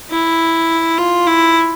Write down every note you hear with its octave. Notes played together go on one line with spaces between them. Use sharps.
E4
F4
E4